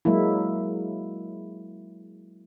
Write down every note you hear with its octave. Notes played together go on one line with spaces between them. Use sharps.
F#3 G#3 A#3 E4